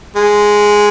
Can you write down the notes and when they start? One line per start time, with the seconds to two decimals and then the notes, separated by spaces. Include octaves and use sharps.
0.16 G#3